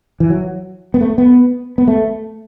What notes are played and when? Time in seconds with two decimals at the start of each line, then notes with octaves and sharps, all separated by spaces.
0.20 E3
0.30 F#3
0.94 B3
1.01 A3
1.18 B3
1.78 B3
1.88 A3